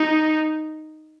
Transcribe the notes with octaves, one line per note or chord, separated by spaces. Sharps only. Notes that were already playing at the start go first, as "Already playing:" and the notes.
Already playing: D#4